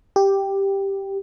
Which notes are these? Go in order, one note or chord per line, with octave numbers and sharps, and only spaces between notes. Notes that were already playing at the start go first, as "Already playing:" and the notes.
G4